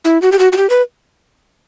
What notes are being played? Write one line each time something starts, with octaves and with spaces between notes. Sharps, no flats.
E4
F#4
G4
F#4
F#4
G4
B4